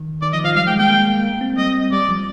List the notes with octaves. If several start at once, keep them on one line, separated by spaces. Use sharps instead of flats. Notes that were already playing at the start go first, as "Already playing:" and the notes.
Already playing: D#3
D#3 D5
F3 D#5
F3 F5
G3 F5
G#3 G5
A#3 G5
A#3
A#3
A#3
C4
G3 D#5
G3 D5
F3